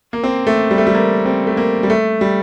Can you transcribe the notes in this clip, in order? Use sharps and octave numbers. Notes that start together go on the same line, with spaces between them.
A#3
C4
A3
G3
A3
G3
A#3
C4
A3
A#3
G3
A3
G3